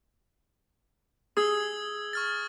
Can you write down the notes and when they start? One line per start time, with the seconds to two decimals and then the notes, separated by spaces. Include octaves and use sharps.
1.37 G#4 D#6 E6 G#6
2.13 C#6 F6 A6